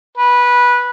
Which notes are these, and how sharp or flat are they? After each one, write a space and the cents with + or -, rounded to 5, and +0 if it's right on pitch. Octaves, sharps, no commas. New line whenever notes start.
B4 -15